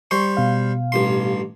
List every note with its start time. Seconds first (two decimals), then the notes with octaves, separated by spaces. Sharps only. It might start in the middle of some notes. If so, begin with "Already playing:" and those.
0.11 G3 C5 C6 C#6
0.37 B2 F5
0.92 A1 G2 C6